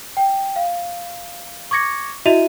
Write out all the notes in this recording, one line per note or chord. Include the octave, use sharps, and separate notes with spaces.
G5
F5
C#6 D6 G#6 A#6 C#7
E4 F#4 D#5 E5 D#7 F7